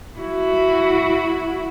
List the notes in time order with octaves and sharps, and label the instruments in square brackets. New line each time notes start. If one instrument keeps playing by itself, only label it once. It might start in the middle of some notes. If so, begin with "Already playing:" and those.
[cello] E4 F#4